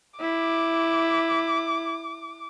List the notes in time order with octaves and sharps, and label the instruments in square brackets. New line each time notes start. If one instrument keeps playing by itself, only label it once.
[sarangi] E4 [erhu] D6